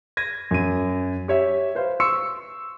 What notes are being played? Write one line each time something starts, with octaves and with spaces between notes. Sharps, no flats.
G#6 A#6 D#7
F#2 D#7
G4 C#5 E5
B4 C5 F5
C6 C#6 E6 C#7